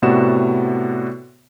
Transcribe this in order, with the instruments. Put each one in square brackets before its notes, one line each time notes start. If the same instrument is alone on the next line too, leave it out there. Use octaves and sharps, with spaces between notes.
[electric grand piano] A2 C3 B3 F#4 D5 E7